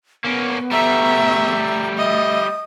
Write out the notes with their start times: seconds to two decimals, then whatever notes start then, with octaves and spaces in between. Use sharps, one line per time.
0.24 A#3 B3 C#4
0.72 G3 A3 E5 A#5
1.98 D#5 E5 D#6